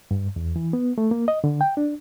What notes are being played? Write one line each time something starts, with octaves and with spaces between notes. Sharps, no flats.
G2
E2
E3
B3
A3
A#3
D#5
D3
G5
D4